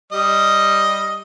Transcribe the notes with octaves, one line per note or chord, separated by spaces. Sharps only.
G3 D#5